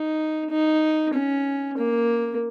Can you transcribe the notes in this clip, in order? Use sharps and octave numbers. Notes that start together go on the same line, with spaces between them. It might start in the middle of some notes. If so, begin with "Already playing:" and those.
Already playing: D#4
D#4
C#4
A#3